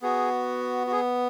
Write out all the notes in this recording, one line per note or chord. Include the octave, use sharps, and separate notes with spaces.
B3 F#4 G#4
F#4
G#4